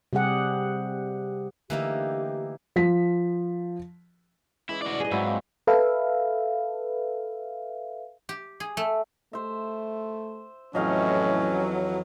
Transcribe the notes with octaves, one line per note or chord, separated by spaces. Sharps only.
C3 G3 G4 G#4 F#5
D3 E3 A3 A#3 D#4 G4 E5
F3 B6
E3 G#3 C#4 E4
D4 F#4 B4 D5
G#4 D#5
G#2 F#3 A#3 C4 E4 B4
F3 C4
A4 B4 E5 F5
G4
G#4
A3
A3 C5 E5
F2 A2 E3 F#3 C#4 D#5 F5 G5